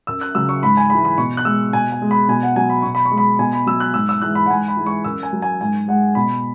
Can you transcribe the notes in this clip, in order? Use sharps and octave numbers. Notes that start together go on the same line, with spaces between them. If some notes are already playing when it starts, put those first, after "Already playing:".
F#2 E6
F#6
C#3 F#3 E6
C#6
G#2 B5
G#5
E3 G#3 B5
B5
B2 C#6
F#6
G#3 E6
B2 G#5
G#5
G#3
B5
B2 G#5
F#5
F#3 G#5
B5
B2 C#6
B5
C#6
G#3
B5
B2 G#5
B5
F#3 E6
F#6
G#2 E6
E6
E3 G#3 F#6
B5
F#5
G#2 G#5
B5
E3 G#3
C#6
F#2 E6
G#5
F#3
G#5
G#2 G#5
G#3 F#5
B2 B5